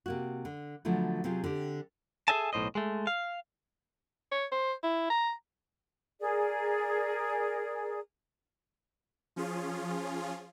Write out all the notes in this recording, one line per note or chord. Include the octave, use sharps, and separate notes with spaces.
C3 A#3 F#4
D3
D3 F3 F#3 A3 B3
C3 F#3 C4 C#4 F4 G#4
D3 C4 G4
G#4 A4 D#5 E5 G#5 A5
B1 A2 C5 D#5
G#3 A3
F5
C#5
C5
E4
A#5
G#4 A#4 D5
F3 C#4 F4 G#4